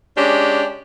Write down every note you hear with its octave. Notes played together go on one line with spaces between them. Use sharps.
G#3 C#4 D4 G4